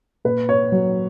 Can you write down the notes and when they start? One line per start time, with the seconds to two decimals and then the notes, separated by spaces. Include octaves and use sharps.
0.25 A#2 B4
0.49 C#5
0.72 F#3